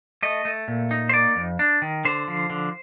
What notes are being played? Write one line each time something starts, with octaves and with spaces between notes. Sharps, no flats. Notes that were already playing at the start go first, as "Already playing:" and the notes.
A3 D#5
A3
A#2
D#4
C5
A#3 D5
F2
D4
D#3
D3 C5
F3
D3